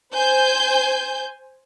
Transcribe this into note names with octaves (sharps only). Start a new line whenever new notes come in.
C5 G#5 G6